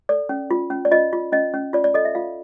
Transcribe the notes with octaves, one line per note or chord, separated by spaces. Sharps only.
A4 D5
C#4
F4
C#4
D5
F4 D#5
F4
C#4 D#5
C#4
F4 D5
D5
A4 D#5
E5
F4 F5